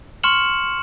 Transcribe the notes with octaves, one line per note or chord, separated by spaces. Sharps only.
C6 C#6 F6 C#7 E7 F#7